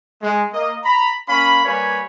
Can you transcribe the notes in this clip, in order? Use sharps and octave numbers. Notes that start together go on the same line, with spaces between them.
G#3
A#3 D#5
A#5 B5
A#3 C#4 F5 B5
G3 A#3 B4 C#5 G#5 B5